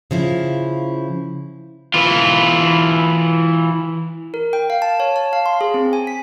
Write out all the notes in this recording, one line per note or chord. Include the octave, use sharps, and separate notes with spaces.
C#3 F3 E4
E3 F4
A#4
G5
F5
A5
C#5
A5
F5
C6
G#4
C4
G#5
B6